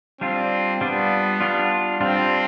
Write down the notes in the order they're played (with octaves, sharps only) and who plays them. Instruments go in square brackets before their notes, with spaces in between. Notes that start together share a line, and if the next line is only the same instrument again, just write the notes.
[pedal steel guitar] G3 D4 F4 [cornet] C4
[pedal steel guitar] G3 D4 F4 [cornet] B3
[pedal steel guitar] G3 D4 F4
[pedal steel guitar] G3 D4 F4 [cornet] C4